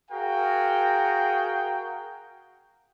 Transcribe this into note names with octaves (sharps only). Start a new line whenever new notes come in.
F#4 G#4 A#4 F5 G5